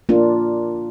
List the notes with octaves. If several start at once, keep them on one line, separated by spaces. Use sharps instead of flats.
A#3 D4 F4